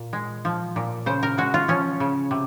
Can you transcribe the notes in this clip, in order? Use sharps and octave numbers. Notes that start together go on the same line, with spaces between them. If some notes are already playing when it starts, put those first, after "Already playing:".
Already playing: A#2
G#3
F3
A#2
C#3 C5
A#4
G#3 F#4
F4
F3 C#4
C#3
C3